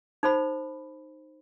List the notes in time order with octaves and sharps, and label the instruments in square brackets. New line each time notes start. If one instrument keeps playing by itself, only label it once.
[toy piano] D#4 A4 C5 B5